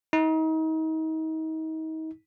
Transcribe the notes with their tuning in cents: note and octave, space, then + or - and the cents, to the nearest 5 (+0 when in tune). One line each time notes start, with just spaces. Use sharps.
D#4 +35